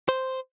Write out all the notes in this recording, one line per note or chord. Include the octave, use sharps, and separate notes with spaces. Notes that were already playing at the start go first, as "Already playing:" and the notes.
C5